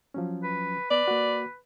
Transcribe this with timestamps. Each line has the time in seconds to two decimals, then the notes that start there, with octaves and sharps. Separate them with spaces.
0.14 F3 F#3 C#4
0.43 B4
0.91 B3 B4 D5
1.08 A#3 F#4